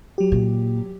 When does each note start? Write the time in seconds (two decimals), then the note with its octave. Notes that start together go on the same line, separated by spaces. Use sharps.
0.18 F#3 G4
0.32 A#2